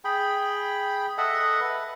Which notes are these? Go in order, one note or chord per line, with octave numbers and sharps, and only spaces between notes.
G#4 G5 B5
A4 D#5 E5 F#5
B4